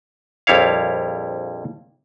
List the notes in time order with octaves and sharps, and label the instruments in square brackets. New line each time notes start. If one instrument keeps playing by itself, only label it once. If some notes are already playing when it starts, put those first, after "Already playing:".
[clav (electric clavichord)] A#1 F2 G3 E4 C#5 F5